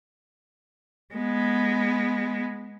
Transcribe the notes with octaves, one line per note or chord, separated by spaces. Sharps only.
G#3 B3